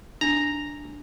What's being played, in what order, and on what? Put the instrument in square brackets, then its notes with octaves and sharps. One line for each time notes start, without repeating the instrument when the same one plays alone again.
[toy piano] D4 [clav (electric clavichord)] A#5